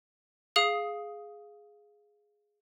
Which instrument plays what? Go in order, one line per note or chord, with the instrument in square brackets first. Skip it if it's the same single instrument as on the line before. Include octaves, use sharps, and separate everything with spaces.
[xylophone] G#4 F5 D#6 F7